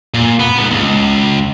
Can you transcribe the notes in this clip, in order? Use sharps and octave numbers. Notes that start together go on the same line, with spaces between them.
A#2
B3
G#2 B3
C#2